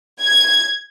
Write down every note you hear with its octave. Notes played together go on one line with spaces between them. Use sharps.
G#6